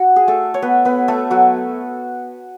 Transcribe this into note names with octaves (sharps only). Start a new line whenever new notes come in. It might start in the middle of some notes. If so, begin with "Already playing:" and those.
Already playing: F#4
G#4
A3 A4
C#5
B3 B4
B3 B4
A3 A4
F#3 F#4